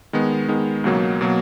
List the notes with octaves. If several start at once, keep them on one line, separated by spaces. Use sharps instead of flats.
D#3 G#3 B3
D#3 G#3 B3
C#2 B2 F#3 A#3
B2 F#3 A#3